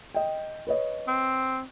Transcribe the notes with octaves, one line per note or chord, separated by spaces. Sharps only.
D#5 G5
B4 C#5 D#5
C4